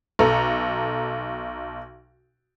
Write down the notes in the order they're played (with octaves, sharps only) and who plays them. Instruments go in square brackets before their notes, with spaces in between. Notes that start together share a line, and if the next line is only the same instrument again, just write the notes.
[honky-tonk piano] B1 A4 A#5